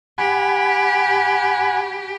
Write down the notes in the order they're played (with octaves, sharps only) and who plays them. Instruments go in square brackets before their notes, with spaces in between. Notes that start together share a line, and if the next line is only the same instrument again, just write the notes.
[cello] G4 [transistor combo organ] F#5 G#5 B5